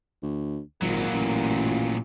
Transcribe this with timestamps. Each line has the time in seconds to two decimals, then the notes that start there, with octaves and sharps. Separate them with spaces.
0.23 D2
0.82 G#1 A#2 F#3 A#3 F4
1.13 A1